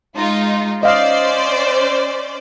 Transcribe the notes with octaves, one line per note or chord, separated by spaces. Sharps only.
G#3 D#4 F4
C#4 C5 D5 D#5 F5